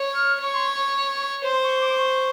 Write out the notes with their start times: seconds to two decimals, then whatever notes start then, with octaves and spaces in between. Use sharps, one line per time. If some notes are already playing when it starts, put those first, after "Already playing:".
Already playing: C#5
0.14 F6
0.41 C#5 C#6
0.54 C6
0.67 C#6
1.45 C5 C6
1.63 C#6
1.80 D6
1.97 C#6